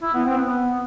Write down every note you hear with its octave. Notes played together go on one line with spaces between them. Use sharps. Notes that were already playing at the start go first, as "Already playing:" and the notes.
E4
B3
C4
B3